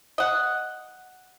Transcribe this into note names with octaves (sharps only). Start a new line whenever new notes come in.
D#5 F#5